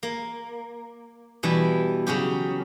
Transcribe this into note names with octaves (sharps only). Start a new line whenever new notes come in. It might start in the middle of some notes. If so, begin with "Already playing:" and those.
A#3
B2 E3 G3
C#3 F#3 C#4 G4